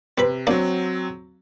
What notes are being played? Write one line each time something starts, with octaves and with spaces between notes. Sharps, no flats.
C3 C4 B4 B5
F#3 A#3 C4 D4